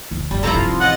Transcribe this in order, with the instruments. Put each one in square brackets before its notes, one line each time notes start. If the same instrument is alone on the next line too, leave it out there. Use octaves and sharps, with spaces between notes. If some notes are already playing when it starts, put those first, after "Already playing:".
[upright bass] D2 A#2
[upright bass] F1 [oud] G3
[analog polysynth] B1 A4 A#5 [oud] C3 F3 E4
[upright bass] G2 F#3 [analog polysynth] F4
[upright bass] D#4
[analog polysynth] A1 D#5 A6 [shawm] F#5